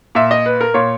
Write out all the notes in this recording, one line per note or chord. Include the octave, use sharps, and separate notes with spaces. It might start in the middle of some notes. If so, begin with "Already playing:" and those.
A#2 E5
D#5
B4
A#4
A#2 C#5